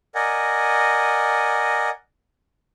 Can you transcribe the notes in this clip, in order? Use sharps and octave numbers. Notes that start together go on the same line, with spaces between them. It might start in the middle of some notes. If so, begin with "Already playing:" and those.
A#4 D5 D#5 F#5 G#5